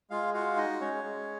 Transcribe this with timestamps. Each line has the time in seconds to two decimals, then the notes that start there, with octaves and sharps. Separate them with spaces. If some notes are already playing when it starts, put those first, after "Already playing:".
0.10 G#3 F4 F5
0.34 F4 F#4 F5
0.57 D#4 D#5
0.80 G#3 C#4 C#5
1.04 G#3